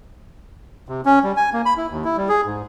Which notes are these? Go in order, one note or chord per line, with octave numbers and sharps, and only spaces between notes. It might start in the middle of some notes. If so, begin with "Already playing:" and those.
C3
C#4
G3
G#5
A#3
B5
E4
D#2
E4
G3
G#4
G#2